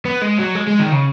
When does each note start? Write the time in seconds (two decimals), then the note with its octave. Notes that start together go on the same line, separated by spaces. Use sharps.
0.05 B3
0.22 G#3
0.38 F#3
0.55 G#3
0.67 G#3
0.79 D#3
0.92 C#3